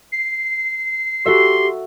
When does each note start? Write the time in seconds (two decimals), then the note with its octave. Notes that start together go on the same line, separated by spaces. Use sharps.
0.12 C7
1.26 F#4 G4 A4 E5 C6